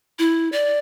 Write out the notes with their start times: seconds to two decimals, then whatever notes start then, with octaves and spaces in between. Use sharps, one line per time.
0.19 E4
0.52 D5